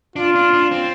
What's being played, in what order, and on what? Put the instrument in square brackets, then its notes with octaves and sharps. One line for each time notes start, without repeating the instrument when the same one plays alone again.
[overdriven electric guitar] D4 [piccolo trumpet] F4
[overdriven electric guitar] D4
D4
C4